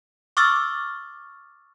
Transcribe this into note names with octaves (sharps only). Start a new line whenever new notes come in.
C#6 D6 E6 F6 A6